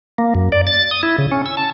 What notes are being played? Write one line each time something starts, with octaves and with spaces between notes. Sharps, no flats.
A#3
F#2
D5
A6
D#6
E4
C#3
C#4
E6
A5